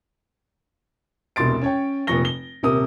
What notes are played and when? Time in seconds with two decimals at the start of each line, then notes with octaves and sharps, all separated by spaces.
1.36 E1 C2 B2 C6 A6 D7
1.62 C#4 C#5 G5
2.07 F1 A#2 F3 C#6 A#6 G7
2.25 G7
2.63 D#1 C3 A#4 D#6